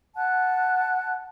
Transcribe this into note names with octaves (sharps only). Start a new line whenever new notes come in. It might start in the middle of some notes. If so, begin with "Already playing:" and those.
F#5 A5 F#6